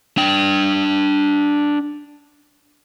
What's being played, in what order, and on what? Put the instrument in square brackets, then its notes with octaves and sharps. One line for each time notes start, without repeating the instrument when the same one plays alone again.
[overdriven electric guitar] D4 G5